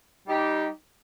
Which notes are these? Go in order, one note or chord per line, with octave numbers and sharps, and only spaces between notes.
G3 D#4 G4